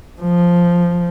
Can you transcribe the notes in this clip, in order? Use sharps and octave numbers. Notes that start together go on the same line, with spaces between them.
F3